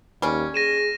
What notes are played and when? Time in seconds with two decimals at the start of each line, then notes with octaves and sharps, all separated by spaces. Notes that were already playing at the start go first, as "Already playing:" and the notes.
0.22 D#2 G3 C#4
0.54 G#4 A#6 D#7 E7